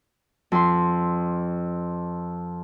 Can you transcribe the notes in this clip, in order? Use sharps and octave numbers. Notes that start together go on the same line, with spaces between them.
F2 C6